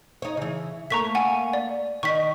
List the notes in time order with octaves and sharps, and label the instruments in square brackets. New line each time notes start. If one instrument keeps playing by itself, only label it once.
[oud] D#4 C#5
C#3 E3
[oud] A3 A#3 [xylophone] A#5 C#6 B6
[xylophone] F#5 G#5
D5
[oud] D#3 D#4 [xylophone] C#6 B6